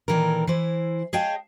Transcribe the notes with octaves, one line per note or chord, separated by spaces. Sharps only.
A#2 D#3 E3 A4 A#4
E3 E4 C5
G#4 C#5 D#5 F5 G5 A5